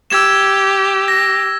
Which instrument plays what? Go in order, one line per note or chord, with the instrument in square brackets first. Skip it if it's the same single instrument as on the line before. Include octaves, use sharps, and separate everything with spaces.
[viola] G4 [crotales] E6 G#6 E7
[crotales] A#6